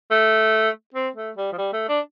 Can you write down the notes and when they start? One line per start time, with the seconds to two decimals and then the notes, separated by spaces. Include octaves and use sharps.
0.11 A3
0.94 C4
1.16 A3
1.36 G3
1.52 F3
1.58 G3
1.73 A3
1.89 D4